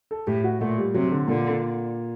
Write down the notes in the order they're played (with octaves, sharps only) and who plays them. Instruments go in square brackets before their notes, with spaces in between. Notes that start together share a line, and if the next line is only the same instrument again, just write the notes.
[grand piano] A4
[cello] A2 [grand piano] G4
[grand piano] F#4
[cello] A#2 [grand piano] A3
[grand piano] G3
[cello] C3 [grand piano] F#3
[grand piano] D3
[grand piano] A#2 [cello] D3